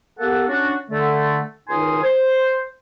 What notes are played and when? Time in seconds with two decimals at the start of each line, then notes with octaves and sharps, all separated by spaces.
0.19 A#3 B3 G4 A4 F#5
0.47 C#4 D4 F#4
0.90 D3 A3
1.69 C#2 D#3 D#4 G#5 C6 D#6
2.03 C5